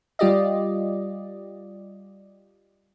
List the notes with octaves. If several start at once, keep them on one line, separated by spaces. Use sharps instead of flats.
G3 F4 G4 D5 D#5